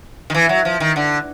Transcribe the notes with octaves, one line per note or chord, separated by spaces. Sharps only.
D#3
E3
F#3
F3
D#3
D3